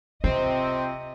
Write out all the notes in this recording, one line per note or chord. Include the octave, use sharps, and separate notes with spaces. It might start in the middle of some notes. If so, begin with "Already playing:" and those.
C3 C4 F4 D#5